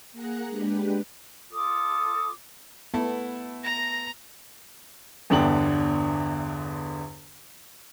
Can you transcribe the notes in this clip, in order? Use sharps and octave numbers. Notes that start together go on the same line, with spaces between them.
A#3 G#4 F#5 A#5 F#6
G#3 D4 G4 B4
F4 A4 D6 D#6
A3 B3 E4 A4
A#5 A#6
G1 E2 D3 D4 G5 F#7